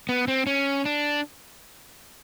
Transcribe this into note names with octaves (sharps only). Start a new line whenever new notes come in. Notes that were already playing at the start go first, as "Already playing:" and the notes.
B3
C4
C#4
D4